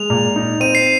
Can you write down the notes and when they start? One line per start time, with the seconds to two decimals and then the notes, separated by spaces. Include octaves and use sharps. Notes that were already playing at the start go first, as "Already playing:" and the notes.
Already playing: G#3 F7
0.10 A#2
0.36 D#4
0.60 C4 D#7
0.75 C7